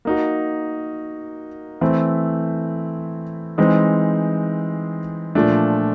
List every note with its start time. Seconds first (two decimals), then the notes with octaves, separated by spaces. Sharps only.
0.05 A#3 D#4 F#4
1.81 E3 A3 C4 E4
3.58 E3 G#3 C4 D#4
5.35 A#2 F3 A3 D4